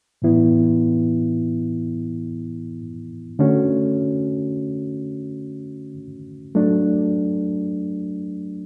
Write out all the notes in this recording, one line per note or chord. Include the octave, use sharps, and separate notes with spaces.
A2 E3 B3 E4
D3 A3 C#4 F#4
F#3 A3 D4